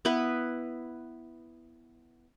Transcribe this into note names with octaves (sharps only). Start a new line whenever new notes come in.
B3 E4 B4